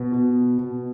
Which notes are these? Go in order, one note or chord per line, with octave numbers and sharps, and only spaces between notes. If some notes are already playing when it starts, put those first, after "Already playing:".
Already playing: B2 B3
B2
B2